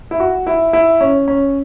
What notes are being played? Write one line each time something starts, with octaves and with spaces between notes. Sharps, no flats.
E4
F#4
E4
E4
C#4
C#4